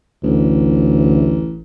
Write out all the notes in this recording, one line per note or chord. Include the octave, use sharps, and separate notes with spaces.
A1 D2